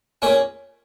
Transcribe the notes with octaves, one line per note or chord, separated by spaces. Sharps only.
A#2 A#3 C#4 G#4